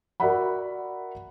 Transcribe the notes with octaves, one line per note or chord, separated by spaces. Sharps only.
F#4 A#4 D5 E5 F#5 B5